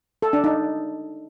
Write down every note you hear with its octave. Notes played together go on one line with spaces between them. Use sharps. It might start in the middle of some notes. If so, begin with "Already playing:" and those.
A4
D4
D#4